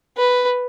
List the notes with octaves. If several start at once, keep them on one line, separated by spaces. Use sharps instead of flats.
B4